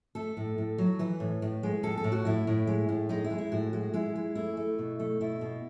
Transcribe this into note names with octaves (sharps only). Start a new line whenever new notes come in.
A3 A4
A2
A2
F#3
E3 B4
A2
A2
G#3
A2 A4
A4
A2
F#4
A2 E4
A2
G#3
A2
G#3 D#4
E4
G#3
E4
A2 F#4
G#3 F#4
G#3 E4
G#3
A3 E4
A3
B2
A3
B2 E4
B2